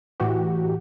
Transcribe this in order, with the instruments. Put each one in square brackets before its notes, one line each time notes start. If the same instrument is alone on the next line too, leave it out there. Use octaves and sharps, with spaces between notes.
[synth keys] A2 E3 F#4 G4